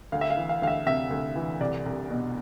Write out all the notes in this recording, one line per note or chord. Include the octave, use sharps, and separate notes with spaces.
D2 F5
E5
F5
E3
F5
D2 F5
E5
C3 E5
D2
E3
C2 D5
C2
B2